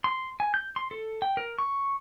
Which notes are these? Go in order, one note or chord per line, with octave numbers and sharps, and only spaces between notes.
C6
G#5
G6
C6
A4
G5
A#4
C#6